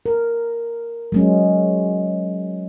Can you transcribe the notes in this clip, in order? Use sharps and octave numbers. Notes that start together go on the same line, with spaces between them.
A#4
F#3 G#3 C#4